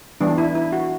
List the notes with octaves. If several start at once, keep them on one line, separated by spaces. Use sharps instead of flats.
E3 G3 B3 D4
E4
E4
F#4